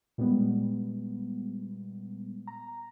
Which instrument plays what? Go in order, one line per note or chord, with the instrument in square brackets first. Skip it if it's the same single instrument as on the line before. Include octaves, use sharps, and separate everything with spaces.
[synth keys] A#2 G3 G#3 B3
A#5